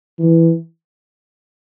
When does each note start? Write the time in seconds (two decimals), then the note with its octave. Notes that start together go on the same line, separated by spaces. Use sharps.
0.19 E3